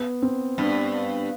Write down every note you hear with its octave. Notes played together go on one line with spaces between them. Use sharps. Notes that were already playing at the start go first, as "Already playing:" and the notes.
Already playing: B3
C4
G2 B3